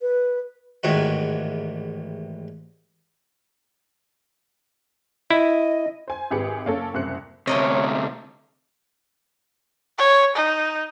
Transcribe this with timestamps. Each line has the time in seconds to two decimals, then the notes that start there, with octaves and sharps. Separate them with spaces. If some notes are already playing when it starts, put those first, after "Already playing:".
0.01 B4
0.83 A1 E2 G#2 D#3 F#4
5.30 E4 D#5
6.08 C5 G#5
6.31 G#1 G4 G#4 B4 C#7
6.65 F#1 A#3 C#4 A4
6.93 F#1 C2 C5 F#6 C#7
7.47 D2 C3 A3 A#4 C#5 D#5
9.98 C#5
10.36 D#4